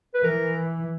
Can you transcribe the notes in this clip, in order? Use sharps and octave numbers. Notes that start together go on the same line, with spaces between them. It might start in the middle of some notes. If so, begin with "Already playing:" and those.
B4
E3 A#4